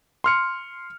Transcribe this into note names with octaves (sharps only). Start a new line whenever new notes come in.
C6 F6 C#7